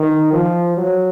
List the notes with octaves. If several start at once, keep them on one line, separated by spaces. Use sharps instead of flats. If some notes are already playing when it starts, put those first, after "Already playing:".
Already playing: D#3
F3
F#3